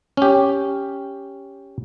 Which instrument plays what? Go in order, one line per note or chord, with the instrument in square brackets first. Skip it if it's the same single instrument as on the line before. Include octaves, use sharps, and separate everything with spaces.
[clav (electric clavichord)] C#4 G4